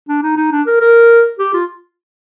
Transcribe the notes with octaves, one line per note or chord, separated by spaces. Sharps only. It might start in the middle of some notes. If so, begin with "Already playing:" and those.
D4
D#4
D#4
D4
A#4
A#4
G4
F4